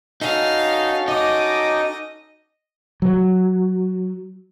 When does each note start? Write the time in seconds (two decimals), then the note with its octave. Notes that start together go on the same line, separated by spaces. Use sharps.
0.21 C#4 D#4 F#4 A4 F5
1.08 D#4 D#5 D6
3.02 F#3